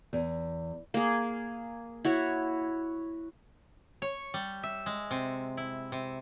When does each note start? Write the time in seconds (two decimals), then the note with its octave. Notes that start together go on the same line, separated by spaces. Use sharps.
0.13 E2
0.94 A#3 G#4
2.05 E4 F#4 C#5
4.02 C#5
4.34 G3
4.63 E5
4.86 G#3
5.11 C3
5.57 E4
5.92 C3